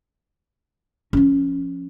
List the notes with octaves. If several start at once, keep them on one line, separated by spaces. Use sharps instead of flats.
F3 C#4